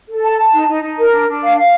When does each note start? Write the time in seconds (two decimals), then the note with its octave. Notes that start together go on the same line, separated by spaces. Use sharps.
0.08 A4
0.22 A5
0.37 A5
0.52 D#4
0.68 D#4
0.82 D#4
0.97 A#4
1.11 D4
1.27 D4
1.42 F5
1.56 F5